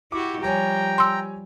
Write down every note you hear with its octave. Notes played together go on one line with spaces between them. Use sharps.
E4 F#4 G4 D6
F3 G3 G4 C#5 G5 G#5 A#5
C6 E6